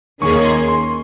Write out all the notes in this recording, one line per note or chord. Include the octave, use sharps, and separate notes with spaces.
D#2 D#3 A#3 C#4 G#4 C#6
C6
C6